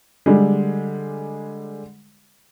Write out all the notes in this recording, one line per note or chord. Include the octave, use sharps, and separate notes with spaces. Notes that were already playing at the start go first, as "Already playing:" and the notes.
D3 G3 G#3